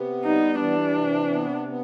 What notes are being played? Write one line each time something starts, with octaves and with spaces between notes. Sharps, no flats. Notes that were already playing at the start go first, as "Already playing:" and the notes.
Already playing: C3 B3
G3 D#4
E3 D4
C3
B3
B3